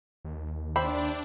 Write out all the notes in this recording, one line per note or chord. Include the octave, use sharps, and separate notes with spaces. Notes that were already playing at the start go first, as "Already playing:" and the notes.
D#2
D4 G4 C5 E5 B5